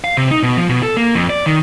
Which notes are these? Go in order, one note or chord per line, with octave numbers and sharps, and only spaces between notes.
F5
C3
D#4
B2
F3
B2
A4
A#3
F2
D5
D#3